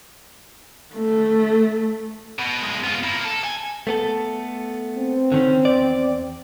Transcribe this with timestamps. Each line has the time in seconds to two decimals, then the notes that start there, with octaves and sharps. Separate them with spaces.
0.95 A3
2.39 B2
2.62 B1 G#3
2.84 B3 F4
3.04 A#3 E4
3.24 A4
3.44 G#5
3.87 A3 B3 A4
4.97 C4
5.32 D3 D#3 C#4
5.65 E2 D5